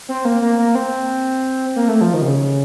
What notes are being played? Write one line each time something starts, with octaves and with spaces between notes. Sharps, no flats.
C4
A#3
A#3
A#3
C4
A#3
A3
F3
D#3
C3
C#3